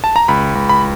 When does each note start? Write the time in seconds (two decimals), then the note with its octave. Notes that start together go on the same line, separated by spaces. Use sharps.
0.04 A5
0.16 A#5
0.28 C#2 B5
0.55 C#2
0.69 B5